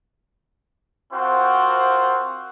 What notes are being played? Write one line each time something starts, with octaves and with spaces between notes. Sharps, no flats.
C4 F4 F#4 A#4 C5